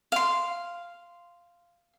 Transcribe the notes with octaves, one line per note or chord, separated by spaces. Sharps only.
F5 C6